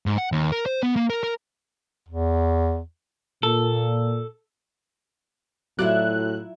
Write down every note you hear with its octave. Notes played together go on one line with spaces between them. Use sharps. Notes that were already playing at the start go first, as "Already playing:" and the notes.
G#2
F#5
D#2
A#4
C5
B3
A#3
A#4
A#4
E2
A#2 A4
A2 F#3 E4 F4 D5 F#6